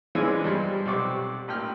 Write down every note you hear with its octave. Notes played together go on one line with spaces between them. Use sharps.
E3 F3 G#3 C#4 D4 G#4
G2 F3 G3 G#3
B1 C3 G3 C4 D5 C#6
A1 A#2 G5 F6